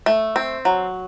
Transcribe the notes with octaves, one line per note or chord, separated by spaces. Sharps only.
A3
C4
F#3